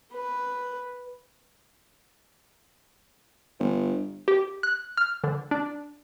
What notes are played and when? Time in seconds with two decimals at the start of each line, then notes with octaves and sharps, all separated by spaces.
0.13 B4
3.60 G1
4.28 G4
4.63 F#6
4.97 F6
5.24 D3
5.51 D4